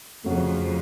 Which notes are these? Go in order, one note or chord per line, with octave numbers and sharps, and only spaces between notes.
F2 C#3 F#3 A3